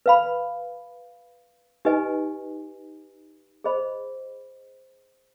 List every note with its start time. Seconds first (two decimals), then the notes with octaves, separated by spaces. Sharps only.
0.06 B4 F5 B5
1.85 D#4 G4 B4 D#5 G#5
3.64 G#4 C5 D#5 B5